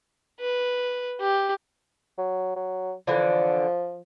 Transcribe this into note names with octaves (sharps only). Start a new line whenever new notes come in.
B4
G4
F#3
F#3
D3 E3 F3